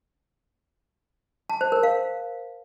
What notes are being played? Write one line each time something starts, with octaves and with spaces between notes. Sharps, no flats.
A5
C5
A#4
F5